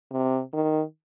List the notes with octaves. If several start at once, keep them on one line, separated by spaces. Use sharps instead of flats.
C3
D#3